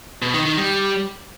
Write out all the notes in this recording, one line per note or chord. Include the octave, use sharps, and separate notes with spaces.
B2
D#3
D#3
G3